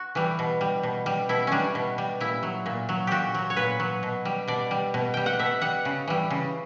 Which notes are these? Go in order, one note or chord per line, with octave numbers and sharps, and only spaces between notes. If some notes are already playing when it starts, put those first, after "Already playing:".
Already playing: F#4
E3 G3
B2
G3
B2
G3
B2 E4
G3 C#4 D4
B2
G3
A#2 E4
F#3
A#2
F#3
A#2 F#4 G4
F#3
C#5
A#2 B4
F#3
B2
G3
B2 D5
G3
B2
G3 G5
F#5
B2 E5
G3 F#5
C#3
E3 G3
C#3